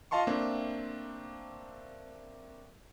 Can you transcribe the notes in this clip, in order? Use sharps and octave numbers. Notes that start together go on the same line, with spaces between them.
F4 D#5 F5 A5 C6 C#6
A3 A#3 C4 D4